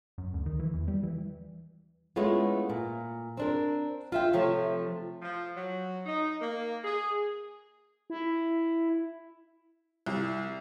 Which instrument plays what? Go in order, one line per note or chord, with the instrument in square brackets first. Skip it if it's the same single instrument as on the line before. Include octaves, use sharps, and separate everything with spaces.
[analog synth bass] F#2
D2
D#3
E3
E2
G3
E3
[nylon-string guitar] G#3 A3 B3 C#4 E4 F4
A#2
C4 D4 A#4
F4 E5 G5
C3 F3 A3 C#5
[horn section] F3
F#3
D#4
A#3
G#4
[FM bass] E4
[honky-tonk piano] C2